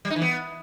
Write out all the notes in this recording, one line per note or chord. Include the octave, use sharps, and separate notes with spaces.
G3
D#4
E3
B3